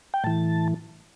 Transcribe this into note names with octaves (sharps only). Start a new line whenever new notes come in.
G5
A2 E3 A5